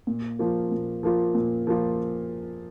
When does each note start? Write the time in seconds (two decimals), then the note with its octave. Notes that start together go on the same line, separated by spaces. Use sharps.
0.07 A#2
0.39 F3 A#3 F4
0.71 A#2
1.03 F3 A#3 F4
1.35 A#2
1.67 F3 A#3 F4